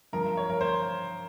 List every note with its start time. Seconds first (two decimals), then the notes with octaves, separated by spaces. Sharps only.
0.13 G2 F3 A#4
0.37 C#5
0.50 A#4
0.61 C5